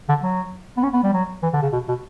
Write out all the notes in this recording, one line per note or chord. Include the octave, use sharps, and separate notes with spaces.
D3
F#3
B3
C#4
B3
G3
F#3
E3
D3
C#3
B2
B2